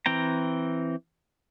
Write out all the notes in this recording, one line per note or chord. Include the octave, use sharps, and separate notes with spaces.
E3 C4 G5 A#5